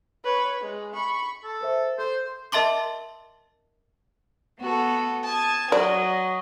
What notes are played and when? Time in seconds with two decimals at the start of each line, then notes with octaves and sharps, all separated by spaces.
0.24 B4 C#5
0.62 G#3
0.94 B5 C#6
1.44 A4
1.61 A#4 C5 E5
1.98 A4 C5
2.52 A#4 D#5 E5 A5 C6 D6
4.59 B3 F#4 A4
5.25 A5 D#6 G#6
5.72 F#3 D5 D#5